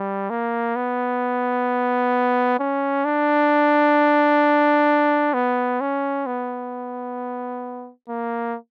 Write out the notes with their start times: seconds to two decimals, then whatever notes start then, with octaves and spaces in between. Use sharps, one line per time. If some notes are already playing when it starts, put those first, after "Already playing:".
Already playing: G3
0.30 A#3
0.76 B3
2.59 C#4
3.04 D4
5.33 B3
5.80 C#4
6.26 B3
8.08 A#3